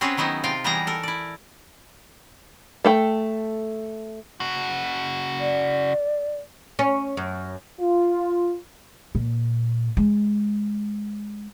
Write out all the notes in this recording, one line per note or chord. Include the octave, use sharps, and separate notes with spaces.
C4 C#4 F#4 G#4 B4 C#5
D#3 F#3 B3 D#4 E4
C3 F4 F5 G5
E3 G3 B3 D#4 G#4 A#5
A4 A#4
E4 D5
A3 A4 G5
C#3 F#4
D5
C#4
F#2
F4
A#2
G#3